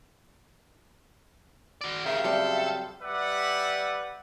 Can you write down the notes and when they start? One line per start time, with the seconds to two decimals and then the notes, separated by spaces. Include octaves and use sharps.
1.81 F#4 D5
2.06 C#3 G4 A#4 E5 F5 G6
2.24 F#3 G3 C4 A4 E5
3.02 G3 B4 D5 E5 F#5